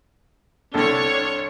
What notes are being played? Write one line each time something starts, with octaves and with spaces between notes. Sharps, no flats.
C2 D3 D4 A4 C#5